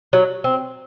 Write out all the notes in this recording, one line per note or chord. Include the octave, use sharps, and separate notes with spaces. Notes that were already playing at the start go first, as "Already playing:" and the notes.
F#3
C4